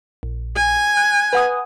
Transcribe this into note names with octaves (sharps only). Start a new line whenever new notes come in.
A#1
G#5
F#6
B4 F#5 D#6